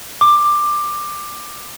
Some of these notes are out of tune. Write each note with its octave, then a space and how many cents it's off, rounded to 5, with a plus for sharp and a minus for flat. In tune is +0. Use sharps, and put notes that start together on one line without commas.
D6 +15